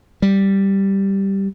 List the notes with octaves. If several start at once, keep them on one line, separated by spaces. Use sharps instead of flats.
G3